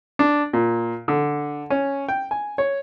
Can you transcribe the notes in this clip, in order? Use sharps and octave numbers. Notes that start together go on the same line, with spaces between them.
D4
A#2
D3
C#4
G5
G#5
C#5